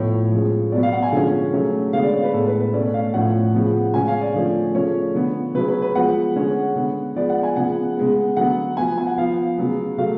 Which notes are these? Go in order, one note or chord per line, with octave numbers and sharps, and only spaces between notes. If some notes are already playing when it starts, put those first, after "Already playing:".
Already playing: A2 F3 B3 C#5
F3 G#3 C#4
B2 F#3 B3 D5
F5
F#5
G#5
D3 F3 G#3 C#4
C#3 F#3 A3 C#4
D3 G#3 B3 F5
D5
C#5
B4
A2 G#3 B3 A4
B4
B4
B2 A3 C#4 D5
F5
A2 F3 A3 C#4 F#5
C#3 F3 B3
C#3 G#3 C#4 G#5
F5
D5
D3 F3 A3 C#4
C#3 F3 A3 C#4 C#5
D3 F3 B3
C#3 F#3 C#4 B4
B4
B4
F3 G#3 B3 F#5
D3 G#3 C#4
D3 G#3 B3
F3 G#3 B3 D5
F#5
G#5
C#3 F3 B3 F#5
C#3 G#3 B3
D3 F#3 B3 F#5
F3 B3 G#5
G#5
F#5
F3 B3 F5
C#3 F#3 B3
C#3 F#3 A3 F5